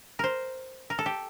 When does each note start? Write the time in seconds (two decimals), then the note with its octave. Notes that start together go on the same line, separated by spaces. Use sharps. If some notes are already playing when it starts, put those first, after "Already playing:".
0.19 A#4 C5
0.90 A#4
0.99 A4
1.06 G4